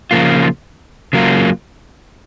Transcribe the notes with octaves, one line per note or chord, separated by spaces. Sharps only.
C#3 F3 A#3 F4
C#3 F#3 A#3 F4